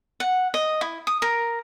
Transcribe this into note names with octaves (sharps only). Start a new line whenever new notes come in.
F#5
D#5
E4
D#6
A#4